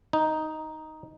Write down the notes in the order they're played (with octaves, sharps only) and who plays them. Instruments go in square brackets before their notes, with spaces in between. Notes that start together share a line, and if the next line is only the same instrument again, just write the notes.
[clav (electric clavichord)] D#4